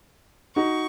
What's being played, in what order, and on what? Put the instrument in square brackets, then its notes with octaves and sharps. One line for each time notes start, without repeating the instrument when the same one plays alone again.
[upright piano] D#4 F#4 [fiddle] C#6